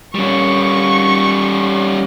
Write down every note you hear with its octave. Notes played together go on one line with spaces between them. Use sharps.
G3 C#4 C#6